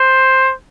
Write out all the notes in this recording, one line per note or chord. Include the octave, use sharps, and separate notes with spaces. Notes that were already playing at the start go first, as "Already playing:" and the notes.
Already playing: C5